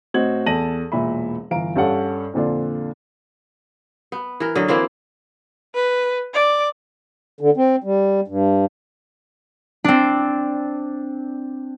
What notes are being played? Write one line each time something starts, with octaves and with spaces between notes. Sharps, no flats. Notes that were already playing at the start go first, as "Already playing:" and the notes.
A2 C4 F#4 D#5 G#6 F#7
E2 A4 A5 A#6 D#7 F#7
E1 A#2 E5 B5
G1 E3 F5 A#5 D7
G2 C#4 A4 F5 F#5
F2 A#2 D3 D4 F4
B3
E3 A#4
D3 F#3 D#5
E3 A#3 C4 E4
B4
D5
D3
C4
G3
G2
C4 D4